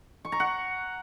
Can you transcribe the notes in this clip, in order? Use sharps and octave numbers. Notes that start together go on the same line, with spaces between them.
C#6
A#5
F#5